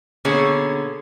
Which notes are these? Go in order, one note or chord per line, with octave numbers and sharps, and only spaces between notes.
B2 D3 A#3 C#4 G#4 C#5